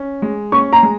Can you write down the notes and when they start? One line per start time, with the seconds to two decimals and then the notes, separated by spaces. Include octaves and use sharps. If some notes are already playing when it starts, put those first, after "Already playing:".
Already playing: C#4
0.22 G#3
0.52 C#4 C#6
0.73 A#5
0.83 G#3